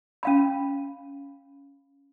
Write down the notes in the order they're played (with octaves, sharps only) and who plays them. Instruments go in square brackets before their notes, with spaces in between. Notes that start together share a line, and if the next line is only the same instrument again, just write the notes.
[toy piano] C#4 F5 B5